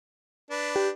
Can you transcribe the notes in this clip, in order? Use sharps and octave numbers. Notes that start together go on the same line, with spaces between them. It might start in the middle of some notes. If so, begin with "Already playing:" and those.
D4 B4
G4